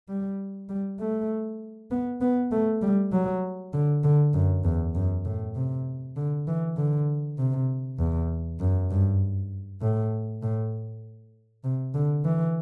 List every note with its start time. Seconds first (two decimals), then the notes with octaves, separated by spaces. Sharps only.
0.09 G3
0.69 G3
1.00 A3
1.91 B3
2.21 B3
2.52 A3
2.82 G3
3.12 F#3
3.73 D3
4.04 D3
4.34 F#2
4.64 E2
4.95 F#2
5.25 A2
5.55 C3
6.17 D3
6.48 E3
6.77 D3
7.38 C3
7.99 E2
8.60 F#2
8.91 G2
9.81 A2
10.43 A2
11.64 C3
11.95 D3
12.25 E3